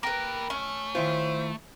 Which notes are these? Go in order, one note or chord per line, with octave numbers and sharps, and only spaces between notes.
A#3 A#4 B4 G5
A3 C#4
D#3 E4 F4 C5